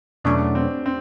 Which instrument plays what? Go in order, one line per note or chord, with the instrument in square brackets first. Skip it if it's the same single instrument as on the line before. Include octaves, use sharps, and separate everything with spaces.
[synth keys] E2 B2 F#3 A3 C#4 [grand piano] D4
[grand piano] C4
C4